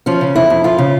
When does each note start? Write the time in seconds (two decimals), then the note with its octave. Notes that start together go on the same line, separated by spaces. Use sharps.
0.06 F3 C#4
0.21 C#3
0.35 F2 E4
0.50 F2
0.64 F3 F4
0.78 C#3